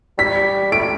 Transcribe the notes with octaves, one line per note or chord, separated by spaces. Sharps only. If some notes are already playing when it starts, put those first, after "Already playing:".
G3 B6
A3 D7